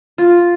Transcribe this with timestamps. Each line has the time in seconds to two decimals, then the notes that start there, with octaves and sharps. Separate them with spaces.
0.18 F4